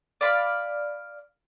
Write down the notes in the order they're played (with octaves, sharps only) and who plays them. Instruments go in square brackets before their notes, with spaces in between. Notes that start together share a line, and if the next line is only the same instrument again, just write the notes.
[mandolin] D5 F5 B5